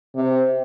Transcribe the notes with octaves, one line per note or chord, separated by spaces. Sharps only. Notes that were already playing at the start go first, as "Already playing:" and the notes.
C3